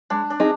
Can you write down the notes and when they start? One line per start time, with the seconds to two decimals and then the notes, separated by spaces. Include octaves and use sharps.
0.10 G#3 D4
0.30 D4
0.40 C4 D#4 G#4